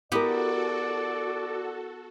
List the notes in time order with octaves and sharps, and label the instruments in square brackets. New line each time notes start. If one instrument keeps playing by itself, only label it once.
[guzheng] B3 G4 [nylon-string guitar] E4 A#4 [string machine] F#4 A4 [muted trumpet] D5